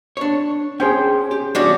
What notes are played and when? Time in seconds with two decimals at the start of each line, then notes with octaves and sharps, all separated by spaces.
0.17 D4 C#5
0.80 C#4 G#4 C5 G5
1.31 G4
1.55 E2 G3 D4 F#4 D5 F5